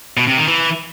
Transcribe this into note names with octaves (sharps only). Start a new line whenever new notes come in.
B2
C3
D#3
E3